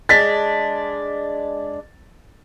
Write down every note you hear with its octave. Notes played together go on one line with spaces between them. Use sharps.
G#3 D4 A6 B6